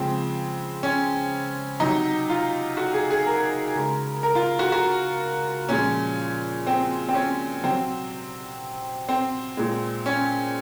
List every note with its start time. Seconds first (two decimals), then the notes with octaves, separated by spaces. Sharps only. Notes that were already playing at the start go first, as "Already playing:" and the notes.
Already playing: C#3 F3 G#3 C4
0.83 C#4
1.80 C3 F#3 D#4
2.30 F4
2.77 F#4
2.93 G#4
3.11 G#4
3.27 A#4
3.75 C#3 G#3
4.23 A#4
4.35 F4
4.59 F#4
4.72 F#4
5.69 A#2 F3 G#3 C#4
6.67 C4
7.09 C4
7.14 C#4
7.63 C3 F#3 C4
9.09 C4
9.57 A#2 G#3
10.06 C#4